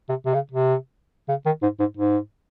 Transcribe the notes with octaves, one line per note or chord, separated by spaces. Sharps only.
C3
C3
C#3
C3
C#3
D#3
G#2
G#2
G#2